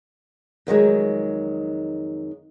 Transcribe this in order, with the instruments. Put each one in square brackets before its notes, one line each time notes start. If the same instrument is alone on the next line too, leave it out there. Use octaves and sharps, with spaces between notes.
[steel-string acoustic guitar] F2 D#3 F#3 G#3